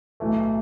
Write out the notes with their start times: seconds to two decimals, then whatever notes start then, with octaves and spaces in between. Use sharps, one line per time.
0.20 B1 A2 E3 A3